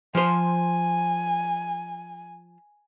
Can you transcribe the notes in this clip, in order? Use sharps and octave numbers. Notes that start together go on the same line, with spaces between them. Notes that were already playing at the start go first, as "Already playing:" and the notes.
F3 C5 G#5